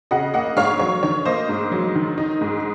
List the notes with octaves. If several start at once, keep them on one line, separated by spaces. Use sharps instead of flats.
C#3 D#5 F#5
A#3 D#5 F#5
G#2 C#5 F5
F#3 C#5
D#3 C#5
A#3 C5 D#5
G#2
F#3
D#3
D#4
G#2